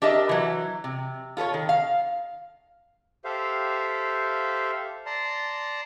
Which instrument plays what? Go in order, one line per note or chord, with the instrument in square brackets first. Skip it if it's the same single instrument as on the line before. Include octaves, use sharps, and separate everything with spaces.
[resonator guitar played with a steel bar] D4 G4 A#4 D#5 E5
E3 F#3
C3
F4 A4 B4 C#5
D#3
F5
[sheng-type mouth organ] G4 A4 C5 E5 F5
D5 A5 A#5 C6